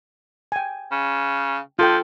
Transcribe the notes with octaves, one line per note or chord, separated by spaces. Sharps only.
G5 G#5
C#3
F3 F4 A4 G5